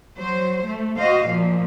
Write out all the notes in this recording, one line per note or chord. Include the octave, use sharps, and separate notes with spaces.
F#3 C5
A3
F#4 C5 D#5 F5
A#2 F3 A#3